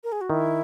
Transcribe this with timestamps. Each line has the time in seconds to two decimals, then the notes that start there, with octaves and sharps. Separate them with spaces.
0.04 A#4
0.12 G#4
0.21 F#4
0.30 D#3 E4